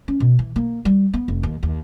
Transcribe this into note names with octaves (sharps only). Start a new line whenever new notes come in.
C#4
B2
E3
A#3
G3
B3
F1
D#2
D#2